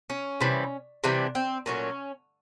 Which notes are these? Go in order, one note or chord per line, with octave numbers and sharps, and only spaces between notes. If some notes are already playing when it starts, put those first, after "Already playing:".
C#4
C3 E3 G3
C3 E3 G3 D4
C4
A#2 F#3 A3 C#4